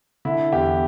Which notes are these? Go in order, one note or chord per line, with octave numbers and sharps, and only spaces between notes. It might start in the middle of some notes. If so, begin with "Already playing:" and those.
D3 E4
E2 G4